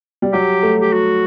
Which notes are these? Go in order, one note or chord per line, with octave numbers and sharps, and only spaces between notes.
G3
F#3 G4
A3
G4
F#4